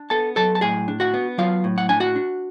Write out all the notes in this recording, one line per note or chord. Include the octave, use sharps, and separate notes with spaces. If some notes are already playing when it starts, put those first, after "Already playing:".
Already playing: D4
B3 A4 A5
F#3 A4 A5
A5
A2 G#4 G#5
D4
F#4 F#5
B3
F#3 F4 F5
A2
F#5
D4 G#5
F#4 F#5
D4